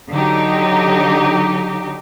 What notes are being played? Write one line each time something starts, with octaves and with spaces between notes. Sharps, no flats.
D3 F#3 D#4 G4